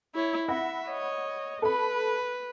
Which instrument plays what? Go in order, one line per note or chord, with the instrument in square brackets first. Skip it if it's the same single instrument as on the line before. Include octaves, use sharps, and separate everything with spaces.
[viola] E4 C#5
[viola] E5 [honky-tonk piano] F#5 B5 A#6
[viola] C#5 D#5
[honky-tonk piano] A4 B5 [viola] B4